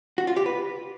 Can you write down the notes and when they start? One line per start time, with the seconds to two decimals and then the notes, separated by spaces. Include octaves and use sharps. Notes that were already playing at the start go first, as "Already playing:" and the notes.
0.18 F#4
0.27 F4
0.37 G4
0.46 B4